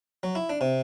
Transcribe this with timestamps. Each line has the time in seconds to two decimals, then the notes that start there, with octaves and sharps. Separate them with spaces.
0.23 F#3
0.35 E4
0.49 D4
0.61 C3